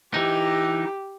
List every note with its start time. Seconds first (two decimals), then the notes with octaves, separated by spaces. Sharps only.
0.14 E3 D#4 G4